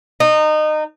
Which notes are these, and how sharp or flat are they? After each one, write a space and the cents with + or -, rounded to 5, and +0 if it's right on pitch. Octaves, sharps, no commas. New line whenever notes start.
D#4 -25